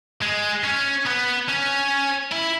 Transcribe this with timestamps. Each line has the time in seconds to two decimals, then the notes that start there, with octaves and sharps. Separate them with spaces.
0.22 G#3
0.64 C#4
1.06 B3
1.48 C#4
2.32 E4